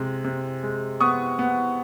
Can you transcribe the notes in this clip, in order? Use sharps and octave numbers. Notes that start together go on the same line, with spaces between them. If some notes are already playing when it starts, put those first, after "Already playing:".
Already playing: C3 G#3
C3
G#3
B3 C#6 D#6
B3